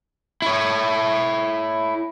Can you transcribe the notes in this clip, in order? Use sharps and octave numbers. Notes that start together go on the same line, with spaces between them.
E4 C#5